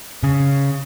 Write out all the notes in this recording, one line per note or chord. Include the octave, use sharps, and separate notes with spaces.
C#3